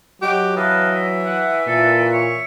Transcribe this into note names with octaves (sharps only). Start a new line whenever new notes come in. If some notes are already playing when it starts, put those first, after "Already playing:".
F#3 G#3 F#4 G4
E3 B4 D#5 F5 A5
E5
F#5
A#2 A4
C#5